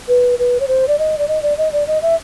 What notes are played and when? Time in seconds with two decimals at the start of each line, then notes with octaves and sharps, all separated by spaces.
0.08 B4
0.39 B4
0.60 C#5
0.68 C5
0.88 D5
0.99 D#5
1.18 D5
1.28 D#5
1.43 D5
1.58 D#5
1.73 D5
1.87 D#5
2.02 E5